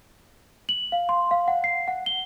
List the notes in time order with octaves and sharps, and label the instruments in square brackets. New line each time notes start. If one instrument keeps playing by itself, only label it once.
[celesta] F#7
F5
C6
F5
F#5
C7
F#5
G7